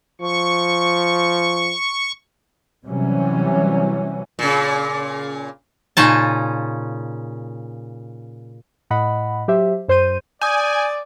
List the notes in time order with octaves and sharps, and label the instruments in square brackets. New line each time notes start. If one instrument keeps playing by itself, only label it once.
[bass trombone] F3 [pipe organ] C#6
[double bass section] C3 E3 F#3 G3 C#4
[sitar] A#2 C#3
[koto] A#2 C#3 C#4 D#4 A5
[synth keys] A2 D#5 F#5 B5
F#3 G4 C5 E5
F#2 C5 C6 G6 D#7
[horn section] D5 [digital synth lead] G#5 [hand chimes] D#6 G6